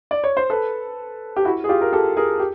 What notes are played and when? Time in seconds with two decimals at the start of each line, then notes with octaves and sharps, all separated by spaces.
0.11 D5
0.24 C#5
0.37 C5
0.50 A4 B4
1.36 G4
1.45 E4 F#4
1.64 G#4
1.69 F4 G4
1.81 A#4
1.92 G4 A4
2.17 G#4 A#4
2.40 G4